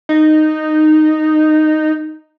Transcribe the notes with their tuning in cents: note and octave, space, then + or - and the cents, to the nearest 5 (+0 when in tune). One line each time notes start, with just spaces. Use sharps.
D#4 -10